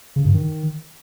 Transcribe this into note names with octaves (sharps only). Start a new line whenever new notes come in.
C#3
G2
D#3